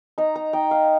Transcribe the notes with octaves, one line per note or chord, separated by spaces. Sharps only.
D#4 A#5
A#5
D#4 G5
F5